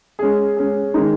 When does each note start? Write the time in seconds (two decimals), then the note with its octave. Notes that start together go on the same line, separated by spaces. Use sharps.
0.19 G#3 C#4 G#4
0.57 G#3 C#4 G#4
0.94 D#3 G#3 D#4